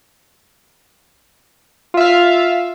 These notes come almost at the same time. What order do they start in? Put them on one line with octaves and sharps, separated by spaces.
F4 E5 F5